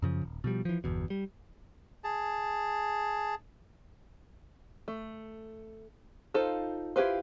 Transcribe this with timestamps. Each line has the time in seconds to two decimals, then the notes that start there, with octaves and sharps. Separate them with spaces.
0.02 F#2 C#3 F3
0.23 D#1
0.44 B2 F3 G3
0.65 E3 F3
0.84 G1 E2 B2
1.10 G3
2.04 G#4 A5
4.88 A3
6.34 D#4 F4 A4 C5
6.96 E4 F4 G4 B4 C5